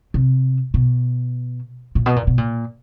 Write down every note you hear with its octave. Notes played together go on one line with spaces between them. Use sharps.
C3
B2
A#2
B2
A#2
B2
A#2